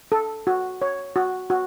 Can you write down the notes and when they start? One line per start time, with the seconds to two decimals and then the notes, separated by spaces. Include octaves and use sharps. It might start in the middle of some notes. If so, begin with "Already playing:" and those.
0.12 A4
0.47 F#4
0.82 C#5
1.16 F#4
1.50 F#4